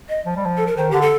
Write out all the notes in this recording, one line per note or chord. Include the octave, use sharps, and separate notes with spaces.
D#5
F3
G3
F3
A4
A#4
D#3 C5
D3 G4
A4